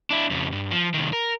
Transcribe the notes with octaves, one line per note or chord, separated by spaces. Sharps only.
D4 E4
F2 C#3
G2
F3
C2 D#3
A#4